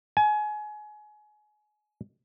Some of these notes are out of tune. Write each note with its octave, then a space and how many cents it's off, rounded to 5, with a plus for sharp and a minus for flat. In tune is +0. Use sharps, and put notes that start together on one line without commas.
G#5 +30